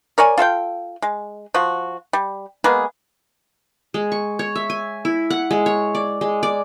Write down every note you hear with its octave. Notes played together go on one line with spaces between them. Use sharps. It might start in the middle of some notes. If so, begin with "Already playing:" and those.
A#4 C#5 D5 G#5
F4 A4 F5 G5
G#3
F3 F#4
G3
G#3 A#3 B3 G#4
G#3
C#6
C#5
E5
G#5
E4
F#5
G#3
C#5
D5
G#3
D5